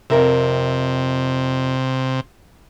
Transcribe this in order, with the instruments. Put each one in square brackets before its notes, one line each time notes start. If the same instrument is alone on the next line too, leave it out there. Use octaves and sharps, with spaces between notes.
[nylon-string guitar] F2 A#4 E5 [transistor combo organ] C3